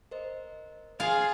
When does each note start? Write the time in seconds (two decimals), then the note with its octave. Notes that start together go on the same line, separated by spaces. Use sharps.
0.11 A#4 C5 D#5
1.00 F4 G#4 F5 G#6